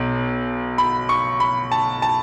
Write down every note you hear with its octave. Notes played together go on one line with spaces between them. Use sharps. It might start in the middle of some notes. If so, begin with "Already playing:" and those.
Already playing: B1 B2
B5
C#6
B5
A5
A5